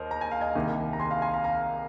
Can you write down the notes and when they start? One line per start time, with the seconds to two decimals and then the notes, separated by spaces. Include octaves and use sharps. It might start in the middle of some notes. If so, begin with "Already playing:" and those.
Already playing: D#2 A#4 C5 D#5
0.11 A#5
0.21 G#5
0.31 F5
0.41 D#5 G#5
0.55 C2 C3 D#3 A#3
0.93 A#5
1.00 G#5 C6
1.11 F5 A#5
1.22 G#5 C6
1.34 F5 A#5
1.44 F5 A#5